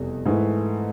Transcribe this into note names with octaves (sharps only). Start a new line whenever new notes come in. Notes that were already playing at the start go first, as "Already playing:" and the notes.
Already playing: F1 E2 B2 G3 B3
G#2 E3 A3